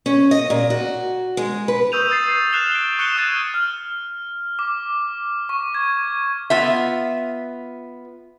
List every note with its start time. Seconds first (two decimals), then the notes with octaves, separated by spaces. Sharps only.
0.06 C#4
0.31 D#5
0.50 A#2
0.70 F#4
1.37 G#3
1.68 B4
1.92 C#6 D#6 E6 G6 D#7 F7
2.10 D#6 A6 C7 D#7
2.53 F6 F#6 C7 E7 F7 G7
2.72 D7 G7
2.99 C#6 F#6 C#7 D#7 E7 G7
3.17 D#6 F#6 G#6 A6 D#7
3.54 F6
4.59 D6
5.49 C#6
5.75 G#6
6.50 B3 F4 E5